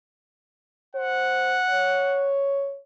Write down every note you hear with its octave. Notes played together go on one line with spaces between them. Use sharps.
C5 F#5
C#5